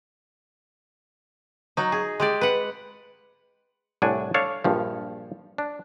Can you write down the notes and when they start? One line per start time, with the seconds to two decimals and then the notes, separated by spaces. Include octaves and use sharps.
1.77 F#3 D#4
1.92 G#4
2.20 G#3 G4 D5
2.41 B4 F#5
4.02 C2 A2 D4 F#5 G#5
4.34 D4 A4 C#5 D5 F5
4.64 A#1 G2 F3
5.58 D4